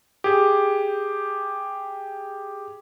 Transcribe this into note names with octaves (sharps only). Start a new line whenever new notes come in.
G4 G#4